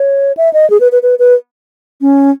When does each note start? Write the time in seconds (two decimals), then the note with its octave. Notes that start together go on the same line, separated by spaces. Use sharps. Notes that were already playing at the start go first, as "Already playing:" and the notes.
Already playing: C#5
0.37 E5
0.53 D#5
0.70 G#4
0.80 B4
0.92 B4
1.03 B4
1.19 B4
2.01 C#4